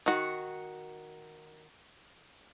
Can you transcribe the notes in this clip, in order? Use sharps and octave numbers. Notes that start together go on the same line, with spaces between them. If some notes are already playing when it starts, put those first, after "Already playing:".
D#3 F#4